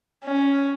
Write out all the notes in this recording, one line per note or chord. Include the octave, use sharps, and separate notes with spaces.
C#4